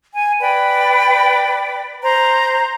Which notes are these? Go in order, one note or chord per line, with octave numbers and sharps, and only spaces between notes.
G#5
B4 D5 G5 B5
C5 A#5